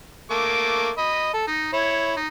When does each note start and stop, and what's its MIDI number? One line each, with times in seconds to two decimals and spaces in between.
0.31 0.90 57
0.31 0.90 58
0.31 0.90 86
0.98 1.29 75
0.98 1.29 83
1.34 1.45 69
1.47 1.68 63
1.73 2.13 64
1.73 2.13 73
2.16 2.27 63